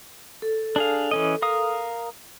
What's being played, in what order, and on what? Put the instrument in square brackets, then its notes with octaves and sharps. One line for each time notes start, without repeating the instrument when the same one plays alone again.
[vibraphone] A4
[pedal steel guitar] D4 G#4 F5
E3 C#4 D#5
A#4 F5 D#6